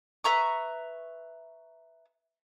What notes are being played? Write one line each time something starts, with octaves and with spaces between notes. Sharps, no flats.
B4 E5 A#5 C#6